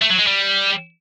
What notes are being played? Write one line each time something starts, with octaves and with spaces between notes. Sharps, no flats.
A3
F#3
G#3
G3